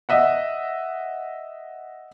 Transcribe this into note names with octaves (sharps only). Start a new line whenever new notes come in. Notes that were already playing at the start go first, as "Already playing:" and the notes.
D#5 E5 F#5